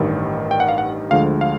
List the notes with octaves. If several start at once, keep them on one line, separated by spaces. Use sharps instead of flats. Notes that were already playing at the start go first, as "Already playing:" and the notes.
Already playing: A1 G2 D#3 G3
G5
F#5
F5
F#5
D2 D3 F3 G#3 F5
F5